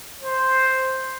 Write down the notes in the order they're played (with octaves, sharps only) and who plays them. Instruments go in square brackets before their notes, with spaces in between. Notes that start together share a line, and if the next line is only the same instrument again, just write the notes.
[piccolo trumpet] C5